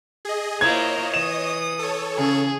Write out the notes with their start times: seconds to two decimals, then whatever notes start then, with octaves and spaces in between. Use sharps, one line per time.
0.25 G#4 D#5
0.61 A#3 E4 F4 C5 C#5 D#5 A#5 G#6
1.14 E3 D#6 E7
1.79 A4 C#5
2.18 C#3 G#4